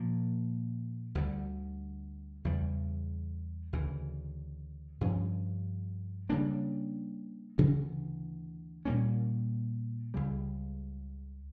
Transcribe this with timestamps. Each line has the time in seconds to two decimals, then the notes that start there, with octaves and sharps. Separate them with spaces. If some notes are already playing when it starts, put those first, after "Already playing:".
Already playing: A#2 F3 A#3
1.15 D2 D3 G3
2.45 E2 C#3 G3
3.73 D2 C#3 E3
5.01 G2 F3 C#4
6.29 C#3 G3 A#3 D4
7.58 D2 C#3 E3
8.85 A#2 G3 A#3 C#4
10.14 C#2 C#3 G3